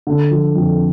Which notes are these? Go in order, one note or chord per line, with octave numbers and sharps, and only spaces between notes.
D3
F3
F2